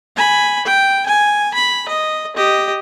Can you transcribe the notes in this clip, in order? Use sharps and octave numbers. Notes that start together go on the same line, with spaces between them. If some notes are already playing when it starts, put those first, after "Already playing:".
G#5 B5
G5
G#5
B5
D#5
G4 D#5